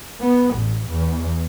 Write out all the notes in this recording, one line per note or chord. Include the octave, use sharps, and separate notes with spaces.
B3
A1
E2